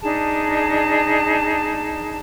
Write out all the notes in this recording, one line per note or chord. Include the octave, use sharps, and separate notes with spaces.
D4 D#4 G#4 A5